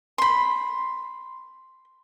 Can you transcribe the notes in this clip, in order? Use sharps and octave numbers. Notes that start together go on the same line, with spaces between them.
B5 C6